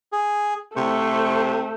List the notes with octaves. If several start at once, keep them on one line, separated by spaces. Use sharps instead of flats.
G#4
C3 A3 C5 C#6